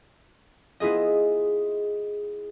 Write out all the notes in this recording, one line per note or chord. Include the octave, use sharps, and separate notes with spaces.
B3 E4 F4 G#4 D#5